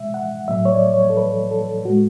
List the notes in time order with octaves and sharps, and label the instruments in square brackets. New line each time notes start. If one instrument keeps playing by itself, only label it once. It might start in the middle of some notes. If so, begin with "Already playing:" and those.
Already playing: [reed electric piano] B2 G#3 E5
F#5
A2 F#3 A3 E5
C#5
D5
C#5
A4
B4
A4
A2 G#3 F#4